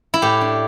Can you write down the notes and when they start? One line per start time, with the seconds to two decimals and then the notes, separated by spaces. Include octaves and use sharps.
0.14 E4
0.22 A2 G4
0.41 D4